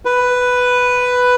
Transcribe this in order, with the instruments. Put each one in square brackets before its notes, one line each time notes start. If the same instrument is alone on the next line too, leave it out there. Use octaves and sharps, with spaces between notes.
[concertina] B4